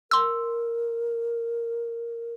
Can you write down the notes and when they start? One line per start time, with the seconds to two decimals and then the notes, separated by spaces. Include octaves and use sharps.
0.11 A#4 C6 E6